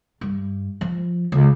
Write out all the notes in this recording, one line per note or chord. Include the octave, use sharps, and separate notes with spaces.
G2
F3
C#2